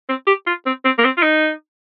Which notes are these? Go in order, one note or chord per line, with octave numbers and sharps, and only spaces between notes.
C4
G4
F4
C4
C4
A#3
C4
F4
D#4